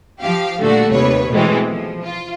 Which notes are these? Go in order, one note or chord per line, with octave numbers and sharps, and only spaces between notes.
F3 G4 F5
A#2 D3 G3 A3 D4 F#4
D#2 C3 B4 C#5
B2 E3 G#3 A3 C4
F3
F4